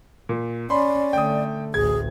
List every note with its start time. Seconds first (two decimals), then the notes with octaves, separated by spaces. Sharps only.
0.29 A#2
0.70 C#4 D5 B5 C6
1.13 D3 A3 G5 D#6
1.74 A1 D2 G#4 G#6